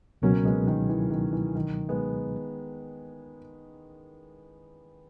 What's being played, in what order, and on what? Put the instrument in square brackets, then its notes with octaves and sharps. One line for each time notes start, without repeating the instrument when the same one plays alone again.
[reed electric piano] C#2 B2 F#3 [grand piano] A#3 C#4
[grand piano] G#3 B3
D#3
E3
D#3
E3
D#3
G#3 B3